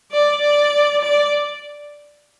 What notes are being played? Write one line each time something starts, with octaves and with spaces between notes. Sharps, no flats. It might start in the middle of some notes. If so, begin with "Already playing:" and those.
D5
D5
D5